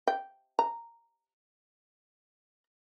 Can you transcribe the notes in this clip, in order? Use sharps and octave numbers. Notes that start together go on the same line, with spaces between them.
G5
A#5